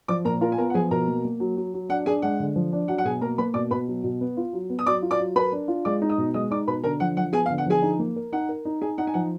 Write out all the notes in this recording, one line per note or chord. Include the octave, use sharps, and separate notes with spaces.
F3 D5 D6
A#2 A#4 A#5
F4 A#4 A#5
G#5
B3 A#4 A#5
F#5
F3 G#4 G#5
B2 A#4 A#5
A#3
A#3
F#3
F#3
F#3
D4 F#5
D4 G#4 G#5
G#3 F#5
D3
F3
D4
F#3 F#5
F#5
B2 G#4 G#5
A#3 A#4 A#5
A#3 B4 B5
B2 D5 D6
B2 B4 B5
F#3
B2
B3
F4
F#3
B3
D#6
F#3 D5 D6
F4
D5 D6
F#3
A#4 B4 B5
D4
F4
G#3 D5 D6
D#4
D#5 D#6
B2
G#3 D#5 D#6
D#4 D5 D6
B2 B4 B5
D3 A#4 A#5
F3 F#5
F3 F#5
B3 G#4 G#5
F5
D3
F#5
F3 G#4 G#5
D#4
A#3
A#4
D#4 F#5
A#4
D#4
D#4 G#4 G#5
D#4 F#5
G#5
F3 F#5